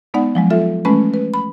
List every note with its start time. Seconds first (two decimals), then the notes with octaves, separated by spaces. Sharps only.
0.14 G#3 B3 D#4 D5 F#5
0.35 F3 F#3 G#3
0.50 F4 A4 E5
0.85 E3 G#3 A3 C#4 B4 B5
1.14 B4
1.34 B5